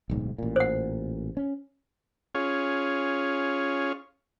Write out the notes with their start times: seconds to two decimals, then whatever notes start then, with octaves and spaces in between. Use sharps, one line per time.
0.10 D1 B1 G#2
0.38 A1 A#2
0.56 C5 F#5
1.37 C#4
2.35 C#4 F4 G#4 C#5